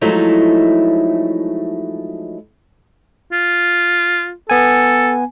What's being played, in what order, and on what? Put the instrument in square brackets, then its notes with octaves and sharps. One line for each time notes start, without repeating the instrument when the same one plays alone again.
[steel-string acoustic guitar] F3 F#3 G#3 A3 D#4 E4
[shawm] F4
[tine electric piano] B3 G#5 [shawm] A4